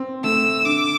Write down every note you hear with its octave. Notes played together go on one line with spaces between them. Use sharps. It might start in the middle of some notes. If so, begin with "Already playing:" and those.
Already playing: C4
A3 E6
D3 D6